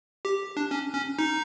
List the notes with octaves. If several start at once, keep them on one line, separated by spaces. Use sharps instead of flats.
G4
D4
C#4
C#4
D#4